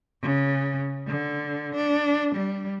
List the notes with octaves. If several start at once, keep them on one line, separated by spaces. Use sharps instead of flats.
C#3
D3
D4
G3